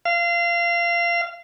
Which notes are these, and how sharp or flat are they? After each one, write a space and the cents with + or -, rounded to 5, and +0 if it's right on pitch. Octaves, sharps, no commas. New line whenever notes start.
F5 -25